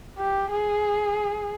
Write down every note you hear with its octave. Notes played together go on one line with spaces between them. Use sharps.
G4
G#4